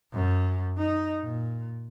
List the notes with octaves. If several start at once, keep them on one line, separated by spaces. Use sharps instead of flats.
F#2
D#4
A#2